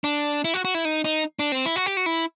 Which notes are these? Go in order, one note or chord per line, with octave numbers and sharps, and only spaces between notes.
D4
E4
F#4
F#4
E4
D#4
D#4
D4
C4
E4
F#4
G4
F#4
E4